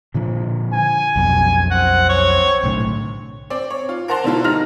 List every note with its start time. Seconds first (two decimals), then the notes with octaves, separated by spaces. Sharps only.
0.14 A#2 D3 F3
0.73 G#5
1.16 B1 F2 B2
1.71 C4 F#5
2.09 C#5
2.63 B1 A2 D3
3.50 C4 D5
3.70 C#5
3.89 F4
4.08 A#4 C5 F#5 A5 A#5 C6
4.24 B2 D3 E4 F4
4.44 G3 D#4 F6 A#6 F7